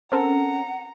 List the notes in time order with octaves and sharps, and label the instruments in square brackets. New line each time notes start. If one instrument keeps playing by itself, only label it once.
[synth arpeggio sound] C4 A4 A#4 [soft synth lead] C#4 [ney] F#5 [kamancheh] A#5